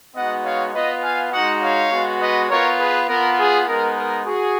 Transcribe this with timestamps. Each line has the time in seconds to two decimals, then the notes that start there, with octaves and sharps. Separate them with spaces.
0.15 G#3 B3 D#4 F#4 D#5 F#5
0.45 C#5 F5
0.74 B3 F4 B4 D#5
1.03 F5 G#5
1.32 G#3 D#4 F#4 D#5 F#5
1.62 C#5 F5
1.92 G#3 B3 F#4
2.21 B4 D#5
2.50 B3 F4 A#4 C#5
2.80 G#4 B4
3.09 B3 F4 A#4
3.39 G#4
3.68 G#3 B3 D#4 A#4
3.97 A#4
4.26 F#4 G#4